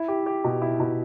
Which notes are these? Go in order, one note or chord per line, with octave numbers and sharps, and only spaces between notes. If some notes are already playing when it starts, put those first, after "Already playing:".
Already playing: E4
G4
G4
B2
E4
B2